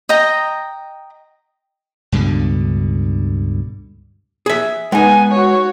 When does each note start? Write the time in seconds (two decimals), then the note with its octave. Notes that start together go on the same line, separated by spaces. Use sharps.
0.09 D#5 G5 A#5
2.12 C#2 G2 B2 D3
4.46 G#4 E5
4.92 G#3 B3 D#4 G#5
5.31 F#4 C#5